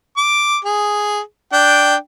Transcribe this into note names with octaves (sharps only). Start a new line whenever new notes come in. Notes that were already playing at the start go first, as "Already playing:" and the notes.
D6
G#4
D4 G5